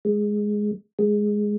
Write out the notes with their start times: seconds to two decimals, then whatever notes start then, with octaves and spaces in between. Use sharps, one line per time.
0.05 G#3
0.99 G#3